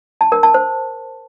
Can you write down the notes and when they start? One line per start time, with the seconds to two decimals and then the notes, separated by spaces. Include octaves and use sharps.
0.21 A5
0.32 A#4
0.43 A5
0.54 C5